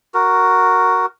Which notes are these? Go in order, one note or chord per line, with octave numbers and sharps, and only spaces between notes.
F#4 A#4